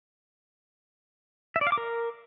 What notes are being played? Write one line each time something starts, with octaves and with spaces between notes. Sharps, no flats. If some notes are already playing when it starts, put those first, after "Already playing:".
E5
D5
F5
D6
A#4